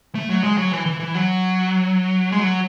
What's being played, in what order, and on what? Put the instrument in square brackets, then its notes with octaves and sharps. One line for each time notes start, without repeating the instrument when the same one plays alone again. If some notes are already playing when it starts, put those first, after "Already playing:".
[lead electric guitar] A3
F#3
G#3
F#3
E3
E3
E3
F#3
G#3
F#3